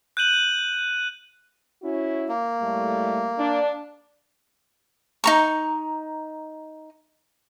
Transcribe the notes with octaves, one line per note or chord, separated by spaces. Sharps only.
F#6 G6 D#7 F#7
C#4 E4 F#4
A#3
A2 G3 A3
D4
D#4 A#5 C#6